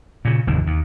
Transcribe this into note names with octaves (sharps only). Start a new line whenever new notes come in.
A#2 C#3
F1 D#2 G#2 D3
D#2